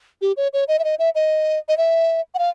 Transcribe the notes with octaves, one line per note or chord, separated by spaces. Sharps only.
G4
C#5
C#5
D#5
E5
D#5
E5
D#5
D#5
E5
F#5
F5